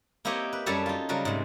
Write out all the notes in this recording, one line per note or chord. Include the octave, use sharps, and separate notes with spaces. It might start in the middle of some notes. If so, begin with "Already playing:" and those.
A#3 C4 E4 G4 C#5 D#5
B4
F#2 G3 A4 C#5 A5
D#4 F4
C#3 F#3 G3 F#4 A#4
G#2 C3